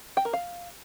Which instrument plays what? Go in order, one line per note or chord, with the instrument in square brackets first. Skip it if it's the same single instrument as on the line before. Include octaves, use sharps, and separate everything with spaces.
[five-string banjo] G5
A#4
F5